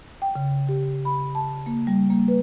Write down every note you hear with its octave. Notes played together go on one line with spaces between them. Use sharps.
G5
C#3
G4
B5
A5
A#3
G3
A#3
B4